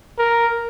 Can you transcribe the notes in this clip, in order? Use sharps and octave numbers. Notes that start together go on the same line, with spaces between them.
A#4